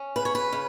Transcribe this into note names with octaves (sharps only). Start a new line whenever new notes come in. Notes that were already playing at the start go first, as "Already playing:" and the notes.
Already playing: C#4
C#3 B4
C#5
B4
C#3